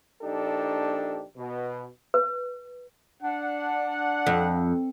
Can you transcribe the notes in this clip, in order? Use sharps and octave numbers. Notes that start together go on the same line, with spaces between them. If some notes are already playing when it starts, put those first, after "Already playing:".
A#1 D4 D#4 G4 A4
B2
B4
D4 F#5
F2